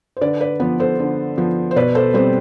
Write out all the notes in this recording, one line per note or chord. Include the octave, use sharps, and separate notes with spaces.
C5
D3 B4 D5
B4 D5
F3 B3 B4
A4 C5
D3
F3 B3
C5
B2 B4 D5
A4 C5
G3 C4 A4 C5